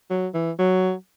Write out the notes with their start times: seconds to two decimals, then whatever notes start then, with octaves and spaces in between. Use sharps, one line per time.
0.11 F#3
0.34 E3
0.59 F#3